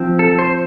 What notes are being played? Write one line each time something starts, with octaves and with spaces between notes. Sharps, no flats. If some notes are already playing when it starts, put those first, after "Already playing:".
Already playing: F3 C4
A4
C5